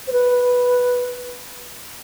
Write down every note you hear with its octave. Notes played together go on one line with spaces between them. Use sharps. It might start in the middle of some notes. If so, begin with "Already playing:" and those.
C5
B4